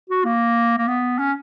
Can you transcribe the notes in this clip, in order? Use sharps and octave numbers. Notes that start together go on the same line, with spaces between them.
F#4
A#3
A#3
B3
C#4